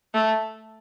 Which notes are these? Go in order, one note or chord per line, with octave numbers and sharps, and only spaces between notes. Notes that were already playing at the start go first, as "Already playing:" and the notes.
A3